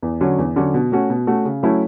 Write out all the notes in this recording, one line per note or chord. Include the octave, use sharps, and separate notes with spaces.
E2
D3 F#3 C#4
E2
D3 F#3 C#4
B2
A3 C#4 F#4
B2
A3 C#4 F#4
C#3
F#3 A3 C#4 E4